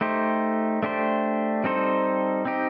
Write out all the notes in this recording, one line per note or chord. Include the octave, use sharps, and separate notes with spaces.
A3 D#4 G4 C5
A3 D4 G4 C5
G3 C4 D#4 A4 C5
C4 D#4 G4